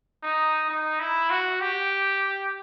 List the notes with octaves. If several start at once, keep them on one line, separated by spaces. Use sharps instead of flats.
D#4
D#4
E4
F#4
G4